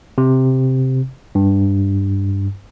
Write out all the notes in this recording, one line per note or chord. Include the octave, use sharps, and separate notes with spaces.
C3
G2